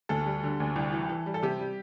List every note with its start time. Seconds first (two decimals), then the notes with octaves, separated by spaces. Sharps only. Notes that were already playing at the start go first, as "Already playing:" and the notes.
0.09 D2 A4
0.26 G3
0.43 D3
0.60 D2
0.76 C2
0.92 E3
1.09 E3
1.26 G3
1.34 A4
1.43 C3 G4
1.59 G3